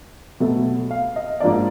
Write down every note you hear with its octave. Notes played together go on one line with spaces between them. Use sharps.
B2 F#3 A3
F5
D#5
G#2 F3 A#3 D4 D5